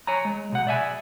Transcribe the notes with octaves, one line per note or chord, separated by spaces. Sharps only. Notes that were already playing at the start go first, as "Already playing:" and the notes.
C#5 G#5 A#5
G#3
B1 F#5
D5 E5 G#5